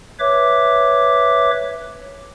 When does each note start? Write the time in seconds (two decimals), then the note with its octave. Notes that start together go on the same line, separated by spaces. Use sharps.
0.19 B4 C#5 E5 D6